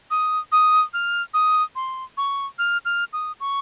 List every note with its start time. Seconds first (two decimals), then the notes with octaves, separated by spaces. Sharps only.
0.11 D#6
0.52 D#6
0.94 F6
1.34 D#6
1.76 C6
2.17 C#6
2.59 F6
2.85 F6
3.13 D#6
3.40 C#6